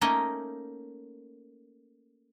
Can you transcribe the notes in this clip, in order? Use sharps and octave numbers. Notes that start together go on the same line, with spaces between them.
A3 A#3 C#4 D#4 D#5 G5